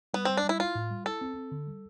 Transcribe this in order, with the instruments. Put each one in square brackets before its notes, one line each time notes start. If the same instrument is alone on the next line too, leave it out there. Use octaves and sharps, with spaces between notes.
[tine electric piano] G3 [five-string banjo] B3
[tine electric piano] G3 [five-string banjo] C4
[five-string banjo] D4
[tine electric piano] G3 [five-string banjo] E4
[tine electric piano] E4 [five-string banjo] F4
[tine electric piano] A2
G3
[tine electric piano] E4 [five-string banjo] A4
[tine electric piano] C4
C4
D3
G3